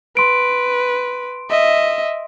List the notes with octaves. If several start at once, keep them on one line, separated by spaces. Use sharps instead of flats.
B4 C6 D7
D#5 E5